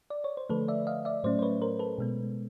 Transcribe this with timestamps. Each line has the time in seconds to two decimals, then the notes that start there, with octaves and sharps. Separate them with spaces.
0.10 D5
0.24 C#5
0.37 C5
0.50 D3 F3 A3 A4 B4
0.68 D5 E5
0.87 D#5 F5
1.05 D5 E5
1.24 A2 F#3 A3 C#4 C5 D5
1.39 C5
1.42 B4 C#5
1.62 A#4 C5
1.79 A4 B4
1.98 B2 G#3 B3